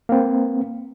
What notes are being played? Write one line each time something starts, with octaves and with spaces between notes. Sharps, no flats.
A#3 C4